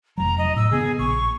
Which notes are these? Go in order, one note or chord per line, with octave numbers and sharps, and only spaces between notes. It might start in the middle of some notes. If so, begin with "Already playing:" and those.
F1 F#3 A#5
D#5
A2 E6
C#3 A3 B3 G#4
A#1 C#6